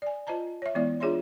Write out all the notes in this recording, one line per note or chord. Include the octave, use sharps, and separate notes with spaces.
D5 G#5
F4 C5 D#5 A5 A#5
C#5 E5
E3 G#3 B3 E4 D5
D4 F4 G#4 C#5 E5 C6